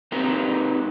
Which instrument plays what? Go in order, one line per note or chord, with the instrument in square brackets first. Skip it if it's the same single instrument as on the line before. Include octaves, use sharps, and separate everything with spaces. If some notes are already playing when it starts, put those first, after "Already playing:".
[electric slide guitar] C4 D#4 G4 A#4 B4